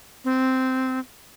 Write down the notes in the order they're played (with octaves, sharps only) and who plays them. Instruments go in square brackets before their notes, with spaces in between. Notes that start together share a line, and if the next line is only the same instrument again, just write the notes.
[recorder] C4